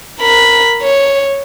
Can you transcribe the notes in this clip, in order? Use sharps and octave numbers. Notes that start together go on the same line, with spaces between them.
A#4 B5
C#5